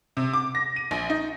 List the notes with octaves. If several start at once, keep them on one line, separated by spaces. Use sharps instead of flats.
C3
D6
A#6
D#7
A#1
D#4